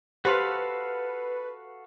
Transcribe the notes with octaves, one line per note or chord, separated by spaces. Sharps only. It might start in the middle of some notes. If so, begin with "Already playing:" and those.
F#4 G4 A4 B4 C5 F5 C6